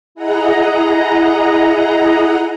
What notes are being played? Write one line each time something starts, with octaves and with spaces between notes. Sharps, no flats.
E4 G#4 D#5 F#5 A#5